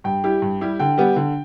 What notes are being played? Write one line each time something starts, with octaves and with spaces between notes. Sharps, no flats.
G2 G5
G3 E4 G4
G2
G3 E4 G4
D3 G5
G3 B3 G4
D3